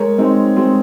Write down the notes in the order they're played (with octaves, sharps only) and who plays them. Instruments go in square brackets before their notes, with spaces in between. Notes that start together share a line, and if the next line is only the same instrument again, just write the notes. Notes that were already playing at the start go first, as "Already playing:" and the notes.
Already playing: [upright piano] G#3 A#4 C#5
G#3 C4 D#4
G#3 C4